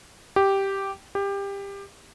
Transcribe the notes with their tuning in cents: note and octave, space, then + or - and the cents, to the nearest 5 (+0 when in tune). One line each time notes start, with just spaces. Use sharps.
G4 -5
G4 +20